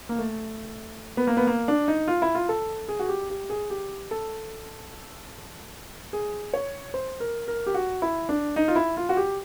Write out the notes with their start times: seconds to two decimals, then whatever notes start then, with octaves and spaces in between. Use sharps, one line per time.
0.09 A#3
0.19 A3
1.17 B3
1.27 A#3
1.37 B3
1.47 A#3
1.68 D4
1.88 D#4
2.08 F4
2.22 E4
2.35 F4
2.49 A4
2.89 G#4
2.99 F#4
3.09 G4
3.30 G4
3.50 G#4
3.70 G4
4.11 A4
6.13 G#4
6.54 C#5
6.94 C5
7.20 A#4
7.48 A#4
7.67 G4
7.74 F#4
8.02 E4
8.29 D4
8.56 D#4
8.68 F4
8.76 E4
8.97 F4
9.09 F#4
9.17 G4